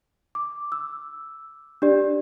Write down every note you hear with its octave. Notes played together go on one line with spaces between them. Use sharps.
D6
E6
D4 G4 D5